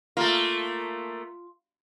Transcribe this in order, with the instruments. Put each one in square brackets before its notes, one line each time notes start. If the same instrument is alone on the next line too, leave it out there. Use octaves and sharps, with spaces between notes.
[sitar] A3 A#3 [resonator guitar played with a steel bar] F4